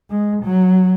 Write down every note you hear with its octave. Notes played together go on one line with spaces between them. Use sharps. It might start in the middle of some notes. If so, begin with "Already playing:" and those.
G#3
F#3